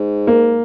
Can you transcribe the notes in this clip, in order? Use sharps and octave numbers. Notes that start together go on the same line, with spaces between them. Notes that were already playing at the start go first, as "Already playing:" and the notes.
Already playing: G#2
A#3